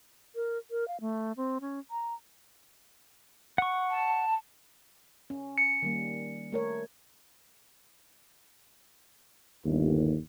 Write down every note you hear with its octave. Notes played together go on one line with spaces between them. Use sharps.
A#4
A#4
F5
A3
C4
C#4
A#5
F#5 C#6
A5
C#4
C#7
D#3 G3 A#3
A3 A#4 C#5
G1 D#2